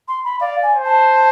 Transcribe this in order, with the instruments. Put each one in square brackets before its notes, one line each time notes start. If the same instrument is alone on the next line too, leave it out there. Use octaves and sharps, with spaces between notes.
[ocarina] C6
B5
[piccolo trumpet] D5 [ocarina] F5
[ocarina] G#5
[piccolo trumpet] C5
[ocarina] A5